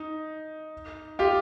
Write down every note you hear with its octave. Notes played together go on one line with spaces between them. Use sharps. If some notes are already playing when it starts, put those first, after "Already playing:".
Already playing: D#4
F4 G4